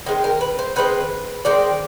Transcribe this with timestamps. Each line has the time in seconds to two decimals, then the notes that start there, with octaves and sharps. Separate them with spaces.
0.06 D#3 G#3 C4
0.24 A#4
0.41 B4
0.59 C5
0.76 D#3 G#3 C4 B4
1.45 D#3 G#3 C4 D5